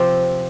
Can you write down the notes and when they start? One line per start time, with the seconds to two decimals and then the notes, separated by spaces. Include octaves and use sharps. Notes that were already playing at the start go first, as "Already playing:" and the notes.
Already playing: C3 F3 C4